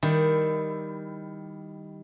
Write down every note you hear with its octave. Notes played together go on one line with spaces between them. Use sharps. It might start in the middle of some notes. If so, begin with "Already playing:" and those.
D#3 G3 E4